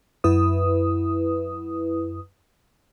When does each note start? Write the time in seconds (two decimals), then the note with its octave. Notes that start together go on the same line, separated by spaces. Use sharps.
0.24 F#2 E4 B4 D#6